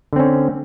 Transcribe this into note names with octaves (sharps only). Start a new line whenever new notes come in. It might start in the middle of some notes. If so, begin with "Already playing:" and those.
D3 C4 C#4